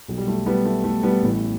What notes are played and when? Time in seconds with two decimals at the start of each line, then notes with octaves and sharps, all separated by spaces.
0.08 B1 B2 F#3
0.18 G3
0.28 A3
0.46 G3 B3
0.65 A3
0.84 A3
1.03 G3 B3
1.22 A1 A2 E3